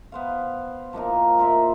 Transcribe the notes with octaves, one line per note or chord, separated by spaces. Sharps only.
B3 C5 F5
F3 A#3 D#4 A#4
A#2 A#4 C5 E5